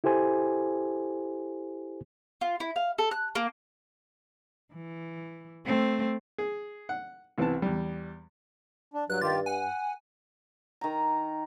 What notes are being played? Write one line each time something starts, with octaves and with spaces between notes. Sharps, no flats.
E4 G4 A4 C5 G#5
F4
E4
F5
A4
F#6
A#3
E3
A3 C4
G#4
F#5
C2 E3 B3 A5
E2 G3
D4
G2 F#3 F#6
D#3 F4 G4 A6
F#5 G#5
D#3 A#5